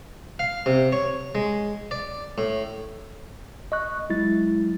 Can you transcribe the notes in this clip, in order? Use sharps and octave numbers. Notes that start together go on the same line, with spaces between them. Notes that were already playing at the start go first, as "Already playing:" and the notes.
F5
C3
C#5
G#3
D5
A2
D#5 C#6 F#6
F#3 G#3 E4 A6